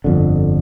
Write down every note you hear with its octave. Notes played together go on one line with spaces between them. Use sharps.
G1 F2 D3